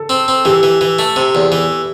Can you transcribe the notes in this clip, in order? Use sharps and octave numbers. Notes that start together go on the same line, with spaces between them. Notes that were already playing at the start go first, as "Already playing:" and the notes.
Already playing: A4
C4
C4
E3 G4
E3
E3
A3
C3
E2
E3